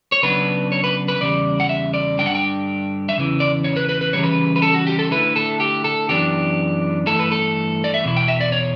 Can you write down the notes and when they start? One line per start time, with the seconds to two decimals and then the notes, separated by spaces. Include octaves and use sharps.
0.12 C#5
0.23 C#3 F#3 B3 D4 B4
0.72 C#5
0.84 B4
1.08 B4
1.21 E2 C#3 G3 D5
1.60 F#5
1.69 E5
1.94 D5
2.18 G2 D3 G3 D4 G5
2.26 F#5
2.35 G5
3.09 E5
3.16 E2 C#3 E3
3.40 D5
3.64 C#5
3.76 B4
3.89 B4
4.01 B4
4.13 C#3 E3 G3 C#5
4.23 B4
4.56 B4
4.62 A4
4.74 F#4
4.87 G4
4.99 A4
5.11 D3 A3 E4 B4
5.36 A4
5.60 G4
5.84 A4
6.09 F#2 E3 B3 D4 G4
7.06 G2 E3 A3 A4
7.19 B4
7.32 A4
7.84 D5
7.94 E5
8.04 E2 B2 E4
8.17 G5
8.28 E5
8.41 D5
8.52 C#5